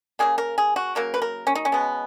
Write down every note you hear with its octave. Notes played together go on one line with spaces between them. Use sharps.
C#3 F#3 A#3 G#4
A#4
G#4
F#4
C#3 F#3 A#3 A#4
B4
A#4
C#4
D#4
C#4
B2 G#3 B3